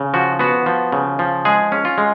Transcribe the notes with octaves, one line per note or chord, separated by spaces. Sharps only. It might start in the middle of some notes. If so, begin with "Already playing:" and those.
Already playing: C#3
F3 F#4
B3 F#4
F3
C#3
F3
G#3 G#4
C#4
F4
G#3